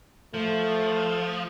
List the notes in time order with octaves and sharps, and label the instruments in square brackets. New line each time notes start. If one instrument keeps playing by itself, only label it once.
[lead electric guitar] F3 [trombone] A3